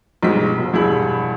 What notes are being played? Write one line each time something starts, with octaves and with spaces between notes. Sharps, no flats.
B1 G2 F3 G#3 B6
F1
E1 G2 E4 G#4 B5 F#7